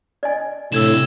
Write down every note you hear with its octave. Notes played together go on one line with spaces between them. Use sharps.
D5 D#5 G#5
A2 C3 D4 E6 G#6 E7